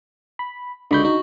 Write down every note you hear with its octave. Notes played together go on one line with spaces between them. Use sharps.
B5
C#2 D3 F#4 B5 G6
D#4 F#4